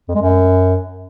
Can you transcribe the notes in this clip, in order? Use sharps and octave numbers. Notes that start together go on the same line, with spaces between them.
F2
G#3
F#2